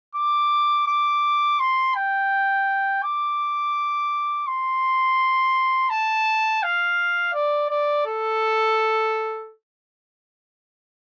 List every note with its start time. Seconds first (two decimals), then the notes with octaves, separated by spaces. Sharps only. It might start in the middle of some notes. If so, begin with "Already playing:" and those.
0.15 D6
0.87 D6
1.59 C6
1.95 G5
3.03 D6
4.47 C6
5.90 A5
6.63 F5
7.34 D5
7.70 D5
8.06 A4